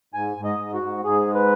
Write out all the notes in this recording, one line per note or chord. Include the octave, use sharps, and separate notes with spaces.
G#2 G#5
G#2
D#5
G#2
F#4
G#2
G#2 G#4
G#3
B4